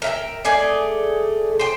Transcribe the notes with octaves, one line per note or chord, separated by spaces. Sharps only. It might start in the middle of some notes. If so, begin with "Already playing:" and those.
A#4 E5 G5
A3 G#4 D5
C5 G5